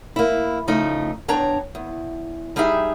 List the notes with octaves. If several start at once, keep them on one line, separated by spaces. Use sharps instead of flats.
A#3 E4
C#3 F3 A3 D#4
E2 D4 C#5 G5 A#5
E2
G3 D#4 G4 G#4 E5